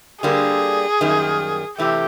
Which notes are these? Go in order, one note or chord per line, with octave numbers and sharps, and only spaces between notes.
D3 G3 A#3 G#4
F#2 D#3 G3 A#3
C3 E3 A3 G4